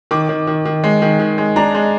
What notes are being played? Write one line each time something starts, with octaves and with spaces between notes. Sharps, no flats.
D#3 D6
D#3
D#3
D#3
G#3
D#3
D#3
G#3
D4 A#5
G#3